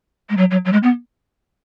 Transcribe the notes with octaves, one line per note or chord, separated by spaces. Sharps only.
G#3
F#3
F#3
F#3
G#3
B3